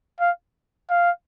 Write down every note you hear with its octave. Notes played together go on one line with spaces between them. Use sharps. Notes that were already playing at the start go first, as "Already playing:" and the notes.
F5
F5